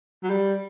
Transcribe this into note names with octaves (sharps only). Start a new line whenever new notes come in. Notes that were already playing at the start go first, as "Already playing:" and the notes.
F#3
G3